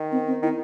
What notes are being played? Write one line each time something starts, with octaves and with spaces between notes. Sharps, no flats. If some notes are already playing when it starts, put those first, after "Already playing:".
Already playing: D#3
C4
C4
D#3 E4